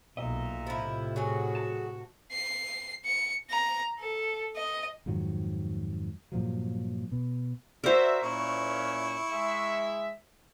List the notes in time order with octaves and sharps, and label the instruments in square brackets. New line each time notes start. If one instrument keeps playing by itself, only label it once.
[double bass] B1 [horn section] A#2 E5 A#5 [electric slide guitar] D#5
[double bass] A2 C3 [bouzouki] F3 E4
[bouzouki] F#3 G#4 [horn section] F#4
[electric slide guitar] A5
[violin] C7
C#7
A#5
A4
D#5
[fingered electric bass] F2 G#2 D#3 F#3
G2 A#2 F3 F#3
B2
[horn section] F#4 D5 E5 [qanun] A#4 C5
[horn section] A#2 C#4 [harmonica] E4 C#6
[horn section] G#3 E5